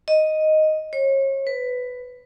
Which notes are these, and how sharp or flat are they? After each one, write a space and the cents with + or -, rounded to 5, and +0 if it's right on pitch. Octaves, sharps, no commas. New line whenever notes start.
D#5 +0
C#5 -35
B4 +10